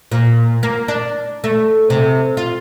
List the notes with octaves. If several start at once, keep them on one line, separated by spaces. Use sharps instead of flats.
A#2
A#3
D4
A3
C3
F4